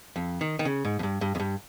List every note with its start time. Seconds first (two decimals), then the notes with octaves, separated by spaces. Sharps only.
0.16 F2
0.41 D#3
0.59 D#3
0.65 C#3
0.85 G#2
0.99 F2
1.03 G2
1.21 G2
1.35 F2
1.40 G2